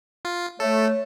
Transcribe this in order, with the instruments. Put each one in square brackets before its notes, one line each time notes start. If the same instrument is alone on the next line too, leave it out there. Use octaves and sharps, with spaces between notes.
[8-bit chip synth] F4
[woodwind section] A3 [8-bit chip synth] A4 [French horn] C#5